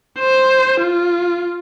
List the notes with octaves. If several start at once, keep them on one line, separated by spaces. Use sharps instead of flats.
C5
F4